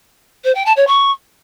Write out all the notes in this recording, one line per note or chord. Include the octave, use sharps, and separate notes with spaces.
C5
G5
A5
C#5
C#6